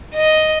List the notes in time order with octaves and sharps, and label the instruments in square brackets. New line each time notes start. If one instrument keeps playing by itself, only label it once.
[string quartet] D#5